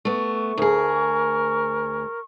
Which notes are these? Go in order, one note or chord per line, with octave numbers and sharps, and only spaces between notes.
A3 B3 C#6
D2 G#4 A#4